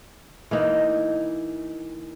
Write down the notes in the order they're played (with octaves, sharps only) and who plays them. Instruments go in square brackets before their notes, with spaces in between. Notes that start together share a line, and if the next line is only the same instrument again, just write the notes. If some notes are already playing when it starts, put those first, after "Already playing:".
[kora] E3 A#3 D#4